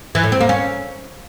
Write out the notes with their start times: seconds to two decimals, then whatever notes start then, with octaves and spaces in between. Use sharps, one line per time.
0.15 E3
0.23 A2
0.32 C4
0.41 A#3
0.49 C#4